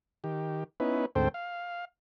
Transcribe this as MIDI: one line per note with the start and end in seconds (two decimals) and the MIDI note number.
0.24 0.64 51
0.24 0.64 67
0.80 1.06 59
0.80 1.06 61
0.80 1.06 63
0.80 1.06 64
0.80 1.06 71
1.15 1.28 38
1.15 1.28 44
1.15 1.28 60
1.15 1.28 69
1.15 1.28 72
1.15 1.28 79
1.34 1.85 77